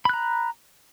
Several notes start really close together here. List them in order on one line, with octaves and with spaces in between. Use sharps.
B5 F#6 A#5